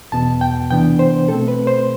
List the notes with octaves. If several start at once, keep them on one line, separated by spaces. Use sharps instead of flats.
E2 B2 B3 A5
G5
C3 E3 B3 D4 G5
C5
B2 A3 C4 A4
B4
C5